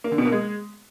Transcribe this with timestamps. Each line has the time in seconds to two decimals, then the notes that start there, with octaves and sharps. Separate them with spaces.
0.04 A#3
0.11 D3
0.18 B2
0.25 A#3
0.32 G#3